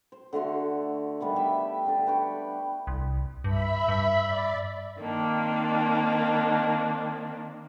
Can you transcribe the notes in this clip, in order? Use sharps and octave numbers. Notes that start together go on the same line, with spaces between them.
C5
D3 A3 F#4 C6
D#3 G3 A3 B3
G4 E5 B5
D3 D5
B4 G5 C#6
C2
G2 E5 B5
G2
D5
D#3 A#3 C4 D4